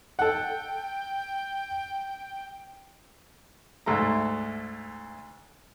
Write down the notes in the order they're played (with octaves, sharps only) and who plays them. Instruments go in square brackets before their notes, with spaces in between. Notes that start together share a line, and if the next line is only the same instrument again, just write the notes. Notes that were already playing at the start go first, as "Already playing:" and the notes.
[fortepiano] A4 F#5 [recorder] G5
[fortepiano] D2 G#2 A3 A#5